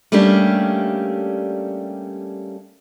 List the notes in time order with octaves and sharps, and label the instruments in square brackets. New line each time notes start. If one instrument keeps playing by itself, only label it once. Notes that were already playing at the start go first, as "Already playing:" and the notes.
[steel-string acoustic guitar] G3 A3 A#3 C#4 D4 G4